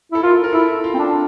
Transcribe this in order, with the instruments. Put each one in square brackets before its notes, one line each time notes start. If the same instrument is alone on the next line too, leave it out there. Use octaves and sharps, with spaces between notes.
[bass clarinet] E4 [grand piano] A4
[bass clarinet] F4 [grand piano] A#4
[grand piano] A#4
[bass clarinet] E4 [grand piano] A4
[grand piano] F4
[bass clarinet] C4
D4